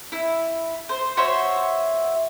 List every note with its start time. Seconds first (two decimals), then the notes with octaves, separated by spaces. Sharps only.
0.12 E4
0.89 C5
1.17 F#4 C5 C#5 E5